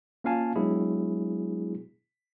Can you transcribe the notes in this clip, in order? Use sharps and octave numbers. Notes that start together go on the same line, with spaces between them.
A#3 C#4 F4 F5 G#5 A5
F#3 G#3 B3 D4 E4 G#4